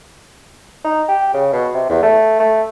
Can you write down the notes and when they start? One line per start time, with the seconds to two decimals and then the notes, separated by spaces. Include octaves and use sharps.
0.85 D#4
1.08 G4
1.34 C#3
1.53 B2
1.74 C3
1.90 E2
2.03 A3
2.40 A3